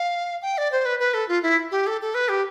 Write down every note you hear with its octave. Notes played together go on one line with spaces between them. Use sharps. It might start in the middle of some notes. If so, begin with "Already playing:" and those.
Already playing: F5
G5
D5
C5
B4
B4
A4
F4
E4
G4
A4
A4
B4
G4